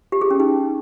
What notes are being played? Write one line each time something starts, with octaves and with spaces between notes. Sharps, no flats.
G4
G#4
C#4
D#4